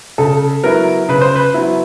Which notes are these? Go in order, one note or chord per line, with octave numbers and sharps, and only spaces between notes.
C#3 A4
F#3 B3 E4 A#4
C#3 B4
C5
B4
F#3 B3 E4